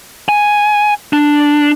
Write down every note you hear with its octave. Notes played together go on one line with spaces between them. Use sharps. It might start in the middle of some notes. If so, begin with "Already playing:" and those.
G#5
D4